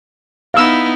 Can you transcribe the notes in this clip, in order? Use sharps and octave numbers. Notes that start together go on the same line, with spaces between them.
B3 D#4 E4 F5 E6